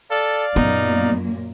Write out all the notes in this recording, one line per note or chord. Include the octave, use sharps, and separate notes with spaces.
A4 D5 F5
F#2 A#2 A#3 B3 D#4